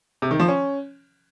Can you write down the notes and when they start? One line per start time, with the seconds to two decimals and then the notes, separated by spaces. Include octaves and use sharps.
0.22 C3
0.31 D#3
0.40 F3
0.48 C#4